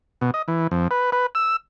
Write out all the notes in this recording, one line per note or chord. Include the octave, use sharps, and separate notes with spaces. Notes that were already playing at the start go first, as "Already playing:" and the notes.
B2
D#5
E3
F2
B4
B4
E6